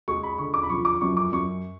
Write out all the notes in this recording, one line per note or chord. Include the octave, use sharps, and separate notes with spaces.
G#3 C#6
B5
D3 C#6
D6
B5
F3 C#6
D6
F#2 C#6
D6
F#2 C#6